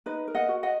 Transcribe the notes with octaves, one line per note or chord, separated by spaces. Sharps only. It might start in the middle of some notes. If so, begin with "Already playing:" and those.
D#4 B4 D#5
A#4
D#5 F#5
F#4
D#5 F#5